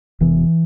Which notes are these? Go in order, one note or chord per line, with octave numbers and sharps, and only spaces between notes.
E1 E2 C3 E3